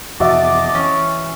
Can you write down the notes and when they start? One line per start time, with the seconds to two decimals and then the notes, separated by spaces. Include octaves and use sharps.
0.20 F2 C3 E3 F#4 D#5 E5 A5 D6
0.75 E3 C#4